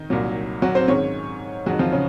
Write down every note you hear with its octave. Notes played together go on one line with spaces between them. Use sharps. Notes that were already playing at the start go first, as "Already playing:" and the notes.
Already playing: D#3 D#4
C2 A#2 F#3
F#3 F#4
C4 C5
G#2 D#3 G#3 C#4 C#5
F2 D#3 F#3 G#3 F#4
F3 F4
C#3 C#4